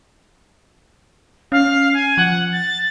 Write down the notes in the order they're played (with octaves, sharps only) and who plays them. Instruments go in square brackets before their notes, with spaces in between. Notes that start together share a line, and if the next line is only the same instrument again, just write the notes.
[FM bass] C#4 [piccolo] F5
[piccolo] G#5
[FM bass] F3 [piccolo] F#5
[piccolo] A6